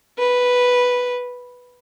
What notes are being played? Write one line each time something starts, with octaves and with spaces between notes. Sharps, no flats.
B4